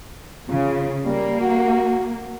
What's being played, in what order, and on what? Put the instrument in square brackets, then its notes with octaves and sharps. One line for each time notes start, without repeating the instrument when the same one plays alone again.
[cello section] C#3 [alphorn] F4
[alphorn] G3 [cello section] A#3
[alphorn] F#4